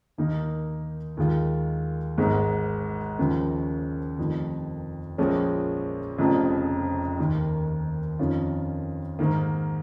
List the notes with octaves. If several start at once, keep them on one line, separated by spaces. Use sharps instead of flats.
D#2 D#3 A#3 D#4
D#2 D#3 G#3 F4
G#1 G#2 G#3
D#2 C#3 F3
F1 F2 D#3
A#1 A#2 F3 G#3 C#4
F1 F2 C#3 F3
D#2 D#3 A#3
F2 D#3 C#4 F4
G#2 D#3 A#3